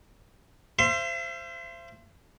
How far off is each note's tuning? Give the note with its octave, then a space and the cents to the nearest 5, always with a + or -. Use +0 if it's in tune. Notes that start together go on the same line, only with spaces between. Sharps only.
C5 +0 E5 +45 C6 +0